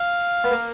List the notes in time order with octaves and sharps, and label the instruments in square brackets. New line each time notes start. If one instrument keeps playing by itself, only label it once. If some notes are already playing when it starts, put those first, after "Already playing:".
Already playing: [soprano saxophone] F5
[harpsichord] B3
A#3